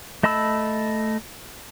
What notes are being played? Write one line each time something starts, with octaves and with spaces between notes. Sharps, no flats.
A3 D#5 A5 B5 E6